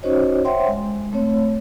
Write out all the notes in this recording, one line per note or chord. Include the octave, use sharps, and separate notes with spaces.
C#4 D#4 F#4 C5 C#5 D#5
C5 C#5 E5 F#5 G5 C6
G#3
A3 C4 C#5